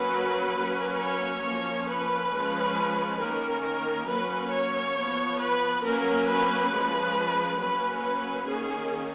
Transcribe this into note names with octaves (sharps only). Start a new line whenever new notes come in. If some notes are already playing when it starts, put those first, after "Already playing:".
Already playing: F#3 A#3 C#4 B4
F#3 A#3 C#4
C#5
F3 A#3 C#4
B4
F3 G#3 C#4
D#3 A#3 C#4 A#4
A#4
F#3 A#3 C#4 B4
C#5
F3 B3
B4
F#3 A#3 C#4 A#4
B4
F3 G#3 C#4
F#3 A#3 C#4 B4
B4
D#3 A#3 C#4 G#4